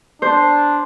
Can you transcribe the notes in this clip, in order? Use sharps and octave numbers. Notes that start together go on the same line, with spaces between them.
D4 C5